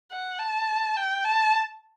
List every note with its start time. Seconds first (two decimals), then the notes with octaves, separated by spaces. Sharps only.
0.12 F#5
0.39 A5
0.97 G5
1.25 A5